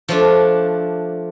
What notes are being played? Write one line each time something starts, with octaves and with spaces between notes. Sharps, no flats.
F3 A3 D4